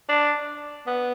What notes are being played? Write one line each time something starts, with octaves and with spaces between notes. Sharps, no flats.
D4
B3